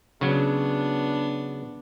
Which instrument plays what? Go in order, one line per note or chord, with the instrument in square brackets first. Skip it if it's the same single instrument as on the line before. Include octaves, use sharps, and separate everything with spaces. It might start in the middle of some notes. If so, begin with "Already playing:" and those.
[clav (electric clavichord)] C#3 F#3 [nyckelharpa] B3 D4